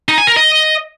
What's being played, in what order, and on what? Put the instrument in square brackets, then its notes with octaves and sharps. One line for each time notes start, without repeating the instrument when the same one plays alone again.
[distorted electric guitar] D#4
G#5
A#4
D#5